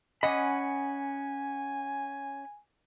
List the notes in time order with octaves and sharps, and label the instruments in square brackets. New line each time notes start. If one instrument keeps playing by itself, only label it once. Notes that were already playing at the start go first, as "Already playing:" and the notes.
[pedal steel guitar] C#4 F#5 B5 [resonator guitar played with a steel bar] D#5 [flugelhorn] G#5